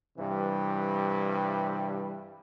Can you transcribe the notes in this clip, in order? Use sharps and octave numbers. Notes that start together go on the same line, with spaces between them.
G2 C3 E3 G3